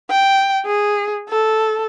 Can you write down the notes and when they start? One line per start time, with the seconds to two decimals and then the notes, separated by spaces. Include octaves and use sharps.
0.11 G5
0.66 G#4
1.29 A4